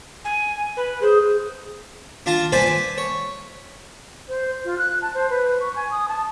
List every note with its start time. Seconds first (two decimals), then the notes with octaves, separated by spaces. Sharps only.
0.25 G#5
0.77 B4
1.02 G#4 C5
2.26 D4 F4 A5 A#5
2.52 B4 C5 D5 G#5 A5 B5
2.98 C#5
4.29 C5
4.65 F4
4.78 F#6
5.02 A5
5.14 C5
5.30 B4
5.61 C#6
5.76 G#5
5.91 D#6
6.08 A5